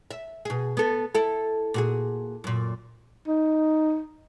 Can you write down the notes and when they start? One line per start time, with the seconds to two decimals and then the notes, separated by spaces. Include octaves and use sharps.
0.11 E5
0.45 B2 G#4
0.77 B3 A4
1.15 E4 A4
1.74 A#2 F#4 G#4
2.44 F#2 A#2
3.28 D#4